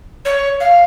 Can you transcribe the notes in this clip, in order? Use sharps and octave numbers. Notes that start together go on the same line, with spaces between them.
C#5
F5